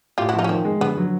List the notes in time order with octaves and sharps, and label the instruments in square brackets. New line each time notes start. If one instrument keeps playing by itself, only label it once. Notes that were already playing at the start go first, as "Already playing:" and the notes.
[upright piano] A2 [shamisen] F4 G4
[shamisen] E4 F#4
[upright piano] F3
[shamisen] D#4 F4
C#4
[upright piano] D#3 [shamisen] C4
[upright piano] G#3
[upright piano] D3 [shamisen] B3
[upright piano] F#3